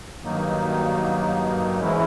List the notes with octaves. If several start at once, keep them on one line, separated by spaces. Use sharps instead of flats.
G2 D#3 F#3 A#3 D#4
G#2 E3 G#3 C#4 E4